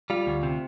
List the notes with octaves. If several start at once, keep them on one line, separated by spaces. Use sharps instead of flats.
G3 F4
D2
C3